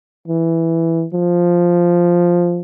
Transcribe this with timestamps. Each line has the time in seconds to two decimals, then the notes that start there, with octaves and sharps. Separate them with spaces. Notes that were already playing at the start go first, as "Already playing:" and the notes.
0.28 E3
1.13 F3